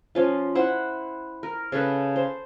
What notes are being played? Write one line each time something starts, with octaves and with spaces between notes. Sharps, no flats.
F3 C#4 F4
E4 C5 F#5
A#4
C#3 C#4 A4 B4
C5